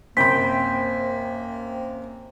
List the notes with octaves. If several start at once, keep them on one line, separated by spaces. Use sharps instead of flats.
F#2 C3 A#3 C5 G5 B5 B6